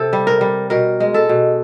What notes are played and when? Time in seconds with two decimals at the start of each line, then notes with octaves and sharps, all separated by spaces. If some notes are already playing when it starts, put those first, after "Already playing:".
Already playing: C3 A4
0.13 G3
0.27 A#4
0.41 G3
0.70 B2 A#4
1.00 G#3
1.14 A4
1.29 B2